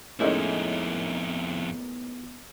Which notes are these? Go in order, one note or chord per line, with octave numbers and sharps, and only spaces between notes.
F2 A2 G#3 A#3 B3 C#4 D#4 E4